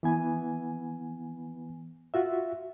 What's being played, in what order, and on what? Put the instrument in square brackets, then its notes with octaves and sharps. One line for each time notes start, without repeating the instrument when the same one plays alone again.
[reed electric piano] E3 B3 G#5
F4 F#4 E5